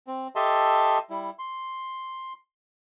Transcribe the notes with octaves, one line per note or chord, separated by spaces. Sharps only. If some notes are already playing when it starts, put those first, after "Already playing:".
C4
G4 A4 D#5 E5 A5 C6
G3 E4
C6